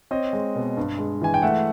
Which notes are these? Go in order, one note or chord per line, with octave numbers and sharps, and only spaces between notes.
C4 C#5 D#5
G#3
B2
G2
G#3
E3 G#5
G5
A3 E5 F#5